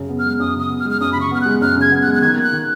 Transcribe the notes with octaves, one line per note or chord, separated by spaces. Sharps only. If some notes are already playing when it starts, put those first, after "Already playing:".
Already playing: F#2 C#3
B3
F6
G#3
F#2 D#6
C#3 D#6
B3
F6
G#3
F6
F#2 D#6
C#3 B5
C#6
B3 F6
G#3 F#6
F#2 F6
C#3
G#6
B3
F#6
G#3
F#6
D#3 G#6
A#3
F#6
D#3